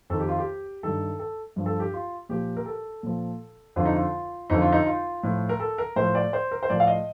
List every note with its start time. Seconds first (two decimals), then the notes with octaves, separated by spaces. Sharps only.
0.10 F2 D#3 A4
0.20 G4
0.28 F4
0.38 G4
0.83 G2 D#3 A4
1.19 A4
1.56 G2 F3
1.66 A4
1.80 G4
1.94 F4
2.29 A#2 F3 G4
2.57 A#4
2.66 A4
3.03 A#2 F3
3.76 F2 D3 F3 F4
3.85 D#4
3.95 F4
4.50 F2 D3 F3 D#4
4.62 F4
4.72 D#4
4.86 F4
5.23 A2 F3
5.49 A#4
5.60 A4
5.78 A#4
5.96 A2 F3 C5
6.15 D5
6.33 C5
6.51 A#4
6.63 C5
6.70 A2 F3 D5
6.80 F5
6.87 D#5